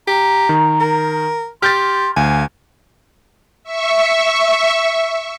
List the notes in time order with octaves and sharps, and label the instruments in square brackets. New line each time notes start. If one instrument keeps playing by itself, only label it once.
[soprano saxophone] G4 [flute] A#5
[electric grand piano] D#3
[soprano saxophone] A#4
[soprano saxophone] G4 [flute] C6 [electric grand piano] F6 G6 A6
[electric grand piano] D2 [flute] F5 [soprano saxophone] G#5
[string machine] E5 C#6